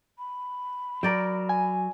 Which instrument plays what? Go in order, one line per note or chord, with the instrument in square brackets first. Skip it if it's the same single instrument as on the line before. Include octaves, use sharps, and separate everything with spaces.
[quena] B5
[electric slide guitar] F#3 [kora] A#4 D5 G5
[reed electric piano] G#5